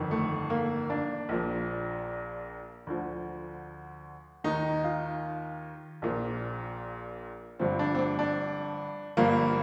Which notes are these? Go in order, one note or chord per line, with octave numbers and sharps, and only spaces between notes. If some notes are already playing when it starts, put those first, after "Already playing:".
Already playing: G1 F2 D#3
A3
A#3
D4
A#1 A#2 F3
D2 D3 F3
D#2 D#3 D#4
F4
A#1 A#2 F3
G1 G2 D3 F3 C4
D4
C4
D4
D4
G1 G2 F3 A#3